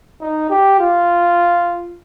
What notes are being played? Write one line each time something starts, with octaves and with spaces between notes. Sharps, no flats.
D#4
G4
F4